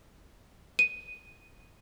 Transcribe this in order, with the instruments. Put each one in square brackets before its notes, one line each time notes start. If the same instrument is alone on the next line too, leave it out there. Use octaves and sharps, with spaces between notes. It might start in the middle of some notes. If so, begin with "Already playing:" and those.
[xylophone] D#7